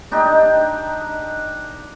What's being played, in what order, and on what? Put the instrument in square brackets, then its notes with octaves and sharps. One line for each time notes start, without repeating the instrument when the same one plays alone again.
[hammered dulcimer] D4 D#4 G4 G5